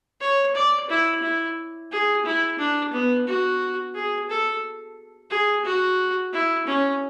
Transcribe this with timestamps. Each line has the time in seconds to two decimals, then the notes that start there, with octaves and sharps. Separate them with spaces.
0.21 C#5
0.55 D5
0.90 E4
1.22 E4
1.92 G#4
2.25 E4
2.58 D4
2.93 B3
3.27 F#4
3.94 G#4
4.30 A4
5.30 G#4
5.65 F#4
6.33 E4
6.67 C#4